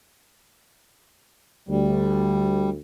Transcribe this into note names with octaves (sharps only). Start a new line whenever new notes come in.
D2 G3